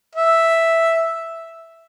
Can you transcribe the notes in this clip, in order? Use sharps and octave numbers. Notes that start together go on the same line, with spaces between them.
E5